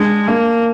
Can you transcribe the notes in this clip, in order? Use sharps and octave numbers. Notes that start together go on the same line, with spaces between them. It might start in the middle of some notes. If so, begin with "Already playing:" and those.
Already playing: G#3 D4
A#3 D4